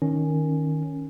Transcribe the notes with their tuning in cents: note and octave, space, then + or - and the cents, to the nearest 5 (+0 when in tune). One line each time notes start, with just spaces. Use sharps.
D#3 +0 C#4 +0